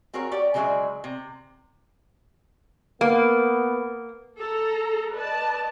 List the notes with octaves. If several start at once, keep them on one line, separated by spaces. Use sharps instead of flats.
C4 F#4 G#4 A#4 C#5
G4 C#5 D5
C#3 F#3 G#3 G4 D5 E5
C3
A#3 B3
A4 A#5
B4 D5 D#5 A5